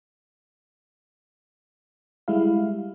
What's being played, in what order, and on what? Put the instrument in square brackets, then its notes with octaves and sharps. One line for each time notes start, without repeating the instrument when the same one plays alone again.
[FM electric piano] G3 G#3 E4 F5